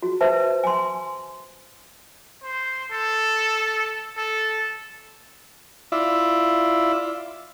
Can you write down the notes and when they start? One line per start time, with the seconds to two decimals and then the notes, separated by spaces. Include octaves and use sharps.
0.03 F#4
0.21 B4 C5 E5 A5
0.64 G#5 C6
2.43 C5
2.91 A4
4.17 A4
5.92 E4 F4 D5 E5